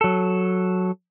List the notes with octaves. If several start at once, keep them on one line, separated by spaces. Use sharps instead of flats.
F#3 A4